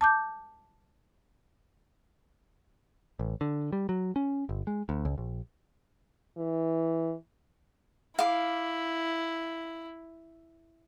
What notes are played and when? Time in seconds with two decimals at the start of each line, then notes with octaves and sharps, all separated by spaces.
0.01 A5 D6 G6
3.19 A1
3.41 D3
3.73 G3
3.89 F#3
4.16 C#4
4.49 G1
4.67 G#3
4.89 D2
5.05 C#2
5.18 A#1
6.37 E3
8.19 E4 F5 D6